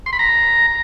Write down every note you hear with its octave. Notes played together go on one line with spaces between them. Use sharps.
C6
B5
A#5